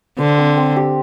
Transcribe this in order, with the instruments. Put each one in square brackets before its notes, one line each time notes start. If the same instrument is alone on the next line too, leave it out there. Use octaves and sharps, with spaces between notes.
[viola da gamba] D3 [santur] C5
[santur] C4
C4
G4